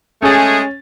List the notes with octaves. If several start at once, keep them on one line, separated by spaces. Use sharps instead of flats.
G#3 A3 C#4 G#4 A6